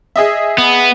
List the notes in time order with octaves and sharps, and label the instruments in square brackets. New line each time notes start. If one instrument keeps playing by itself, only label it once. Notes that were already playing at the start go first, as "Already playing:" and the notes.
[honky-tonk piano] G#4 D#5 E5
[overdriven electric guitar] B3